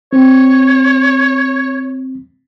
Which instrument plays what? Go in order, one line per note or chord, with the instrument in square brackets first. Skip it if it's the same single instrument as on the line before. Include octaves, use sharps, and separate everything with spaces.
[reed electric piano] C4 [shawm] C#5